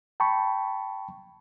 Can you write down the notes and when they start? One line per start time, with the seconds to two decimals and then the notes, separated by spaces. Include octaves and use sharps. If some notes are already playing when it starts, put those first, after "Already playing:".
0.20 G5 A5 B5 C#6